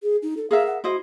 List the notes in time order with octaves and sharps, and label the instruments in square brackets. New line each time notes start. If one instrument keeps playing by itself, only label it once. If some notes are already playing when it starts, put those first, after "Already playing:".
[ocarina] G#4
D#4
A4
[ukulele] G#4 A#4 E5 [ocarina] F5
[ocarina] F#5
[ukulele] E4 C5 D#5 [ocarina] F#4